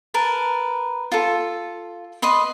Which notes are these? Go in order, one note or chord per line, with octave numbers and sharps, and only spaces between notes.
A#4 B4 A5
F4 A4
B4 D#5 B5 C6